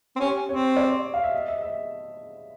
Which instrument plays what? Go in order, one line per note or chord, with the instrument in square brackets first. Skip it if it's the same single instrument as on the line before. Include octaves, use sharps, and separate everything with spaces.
[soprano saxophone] C4
[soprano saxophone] C#4 [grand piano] G4
[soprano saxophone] C4 [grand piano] C#5
[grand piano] D5
F5
E5
D#5
E5
E5